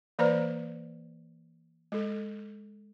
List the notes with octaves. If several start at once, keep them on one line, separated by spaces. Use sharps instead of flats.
E3 A#3 B4 C5 D5 A#5
G#3 A4